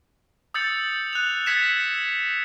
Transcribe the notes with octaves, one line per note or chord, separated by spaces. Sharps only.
D#6 E6 G6 A6 C#7 F#7
F#6 F7
E6 G#6 A6 B6 C#7 E7